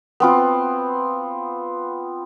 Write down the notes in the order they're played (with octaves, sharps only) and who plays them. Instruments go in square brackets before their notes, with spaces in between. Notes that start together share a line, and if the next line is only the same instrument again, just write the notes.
[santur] B3 C4 F4